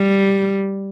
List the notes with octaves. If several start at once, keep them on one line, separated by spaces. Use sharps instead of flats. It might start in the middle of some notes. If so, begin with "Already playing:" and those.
Already playing: G3